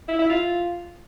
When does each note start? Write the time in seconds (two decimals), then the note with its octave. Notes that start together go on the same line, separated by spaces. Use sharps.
0.08 E4
0.19 E4
0.30 F4